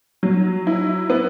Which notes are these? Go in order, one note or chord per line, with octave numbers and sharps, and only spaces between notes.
F#3
E4
B3